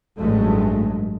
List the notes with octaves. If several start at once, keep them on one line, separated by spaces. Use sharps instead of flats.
A1 G2 F#3 G#3 A3